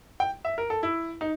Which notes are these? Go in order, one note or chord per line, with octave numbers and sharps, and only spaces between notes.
G5
E5
A#4
A4
E4
D#4